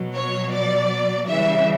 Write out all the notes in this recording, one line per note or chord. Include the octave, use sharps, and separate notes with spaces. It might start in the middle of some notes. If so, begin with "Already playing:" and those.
Already playing: B2 F#3
C#5
D5
C#3 E3 G3 E5